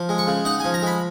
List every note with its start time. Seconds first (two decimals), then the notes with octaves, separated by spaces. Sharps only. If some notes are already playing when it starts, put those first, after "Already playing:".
Already playing: F3
0.09 G#3
0.18 C#6
0.27 C#3
0.45 D#4 F#5
0.60 F3 G#5
0.74 A#5
0.82 G#3 B5